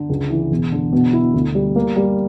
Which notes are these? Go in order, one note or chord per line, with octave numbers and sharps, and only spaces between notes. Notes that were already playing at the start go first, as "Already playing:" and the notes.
Already playing: D3
C#2
E3
E1
D3
B2
E4
D2
G3
A#3
G3